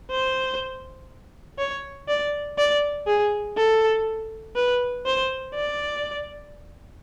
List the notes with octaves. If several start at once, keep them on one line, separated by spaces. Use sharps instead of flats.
C5
C#5
D5
D5
G#4
A4
B4
C5
D5